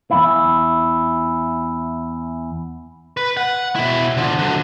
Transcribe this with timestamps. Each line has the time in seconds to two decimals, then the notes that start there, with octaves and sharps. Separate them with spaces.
0.11 E2 G2 E4
3.17 B4
3.37 F#5
3.76 B2 E4
4.17 D3 F3
4.38 D3 F#3